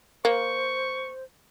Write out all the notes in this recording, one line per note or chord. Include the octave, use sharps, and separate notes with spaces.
A#3 C5 C#6